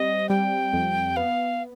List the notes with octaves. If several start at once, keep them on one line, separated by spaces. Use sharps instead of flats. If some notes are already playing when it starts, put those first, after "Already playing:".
Already playing: G3 C4 D#5
G3 G5
F2
B3 F5